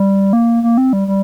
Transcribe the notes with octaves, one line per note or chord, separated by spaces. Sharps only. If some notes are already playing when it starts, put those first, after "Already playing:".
Already playing: G3
A#3
A#3
C4
G3
G3